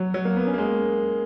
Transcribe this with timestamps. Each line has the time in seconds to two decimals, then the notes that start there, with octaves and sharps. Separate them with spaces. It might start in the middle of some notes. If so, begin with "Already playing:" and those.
Already playing: F#3
0.14 F#3
0.25 A#3
0.36 B3
0.47 C#4
0.54 A#3
0.58 G#3